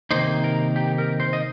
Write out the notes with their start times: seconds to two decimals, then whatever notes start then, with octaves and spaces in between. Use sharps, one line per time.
0.11 C3 D#3 A#3 D#4 C5
0.44 A#4
0.76 G4
0.98 A#4
1.20 C5
1.33 D#5